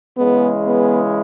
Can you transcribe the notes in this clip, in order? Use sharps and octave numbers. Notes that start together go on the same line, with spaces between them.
C#3 E3 G#3 B3
B3